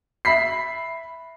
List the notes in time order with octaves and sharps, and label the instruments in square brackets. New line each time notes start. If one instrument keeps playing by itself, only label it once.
[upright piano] E5 B5 B6 C7